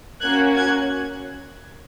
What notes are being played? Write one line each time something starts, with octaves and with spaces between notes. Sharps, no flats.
A#3 C#4 F#4 F#6 G#6
F#6 G#6